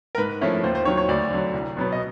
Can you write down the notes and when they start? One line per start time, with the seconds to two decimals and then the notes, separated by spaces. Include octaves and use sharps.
0.15 A#4
0.18 G#2 B4
0.41 F3 A3 C#4 E4
0.64 D#2 C5
0.75 C5
0.85 D#3 F#3 C#5
0.97 C#5
1.08 D2 D5
1.31 D3 F#3
1.54 C2
1.77 B2 F#3 B3
1.92 D#5